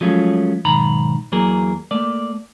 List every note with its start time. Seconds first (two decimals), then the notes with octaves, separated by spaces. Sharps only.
0.01 F3 F#3 G#3 A3 C#4 F4
0.65 B1 G#2 D#3 A#5 B5
1.32 E2 E3 F#3 A#3 G#4 A#4
1.91 A3 A#3 D5